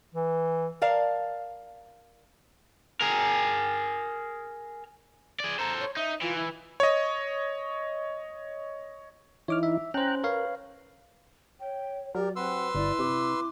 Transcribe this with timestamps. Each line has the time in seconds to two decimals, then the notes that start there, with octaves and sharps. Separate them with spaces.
0.14 E3
0.82 A#4 D5 F5 A5
3.01 G#4 A#4
5.40 G#4 D5
5.59 A4 C5 A#5
5.80 C#5
5.97 D#4 E5
6.22 E3 F4
6.36 E4
6.80 C#5 D#5
9.48 E3 D#4 E4 C#5 D6 F6
9.63 E5
9.94 C#4 C5 G5 A#5 F#6
10.24 A#4 B4 C#5 F5
11.60 C#5 G5
12.15 F#3 G4 A#4 D5
12.36 C4 B4 F#5 C6 E6
12.75 G1 E4 D5
12.99 C3 D6